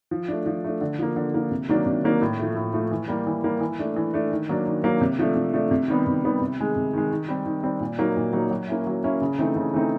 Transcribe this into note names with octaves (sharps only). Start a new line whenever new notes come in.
F3
A3 D4
F3
A3 D4
D3
F3 A#3
D3
F3 A#3
C3
D#3 F#3 A#3 D4
C3
D#3 F#3 A#3 D4
A2
F3 A3
A2
F3 A3
E3
G3 A#3
E3
G3 A#3
E3
A3 D4
E3
A3 D4
D#3
F#3 A#3 D4
D#3
F#3 A#3 D4
C3
F3 A3 D4
C3
F3 A3 D4
C3
D#3 G3 B3
C3
D#3 G3 B3
C3
D#3 G#3
C3
D#3 G#3
D#3
G3 C4
D#3
G3 C4
A#2
F#3 A#3 D#4
A#2
F#3 A#3 D#4
F#3
A#3 C#4 E4
F#3
A#3 C#4 E4
C#3
E3 A3 C4 D#4
C#3
E3 A3 C4 D#4